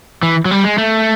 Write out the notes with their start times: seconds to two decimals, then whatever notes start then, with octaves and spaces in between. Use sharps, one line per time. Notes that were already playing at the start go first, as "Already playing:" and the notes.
0.23 E3
0.45 F#3
0.51 G3
0.64 G#3
0.78 A3